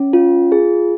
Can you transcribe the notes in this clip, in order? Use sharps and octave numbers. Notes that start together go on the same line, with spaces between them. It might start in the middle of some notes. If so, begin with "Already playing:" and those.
Already playing: C#4
F4
G#4